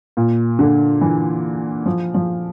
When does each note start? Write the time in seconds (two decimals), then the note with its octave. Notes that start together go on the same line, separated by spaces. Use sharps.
0.17 A#2
0.59 D3
1.01 E3
1.86 F3
2.14 F3